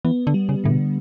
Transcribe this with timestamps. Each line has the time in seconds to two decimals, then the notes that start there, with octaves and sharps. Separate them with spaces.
0.05 E3 B3
0.27 D3
0.34 G3
0.49 C#3
0.64 A2 D3
0.71 B2